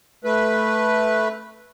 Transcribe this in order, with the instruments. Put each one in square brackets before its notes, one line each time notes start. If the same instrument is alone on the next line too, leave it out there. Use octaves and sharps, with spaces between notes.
[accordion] A3 B4